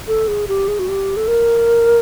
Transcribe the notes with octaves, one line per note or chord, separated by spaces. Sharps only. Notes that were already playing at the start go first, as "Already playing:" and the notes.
A4
G#4
G4
G#4
F#4
G4
A4
A#4